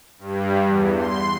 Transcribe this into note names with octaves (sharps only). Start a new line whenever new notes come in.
G2
E2
C6